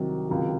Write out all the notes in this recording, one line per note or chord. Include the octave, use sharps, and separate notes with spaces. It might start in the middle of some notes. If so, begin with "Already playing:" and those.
Already playing: C2 C3 D#3 F#3
C#2 C3 D#3 F#3